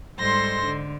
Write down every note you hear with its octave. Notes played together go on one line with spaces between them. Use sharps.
G#2 G3 A4 C5 C6 A#6
D3